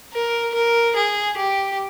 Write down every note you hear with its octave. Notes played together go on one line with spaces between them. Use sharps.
A#4
A#4
G#4
G4